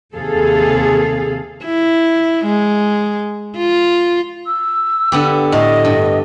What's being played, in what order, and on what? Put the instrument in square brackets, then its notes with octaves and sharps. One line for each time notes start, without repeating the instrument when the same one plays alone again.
[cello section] D#2 C3 G#4 A4 F5
[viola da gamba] E4
G#3
F4
[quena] E6
[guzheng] D3 B3 G4
[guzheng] A2 [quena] D#5
[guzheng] G2